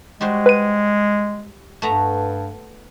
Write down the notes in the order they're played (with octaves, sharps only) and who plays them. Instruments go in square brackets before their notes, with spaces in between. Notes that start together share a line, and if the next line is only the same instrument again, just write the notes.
[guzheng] G3 F#4 C5 [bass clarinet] G#3
[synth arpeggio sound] B4 D#7
[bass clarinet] G2 [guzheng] A3 B3 A#5